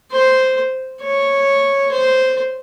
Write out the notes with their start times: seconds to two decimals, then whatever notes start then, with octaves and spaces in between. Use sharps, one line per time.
0.12 C5
1.02 C#5
1.92 C5